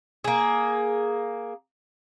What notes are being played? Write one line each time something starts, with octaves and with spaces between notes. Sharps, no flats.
A#3 G#4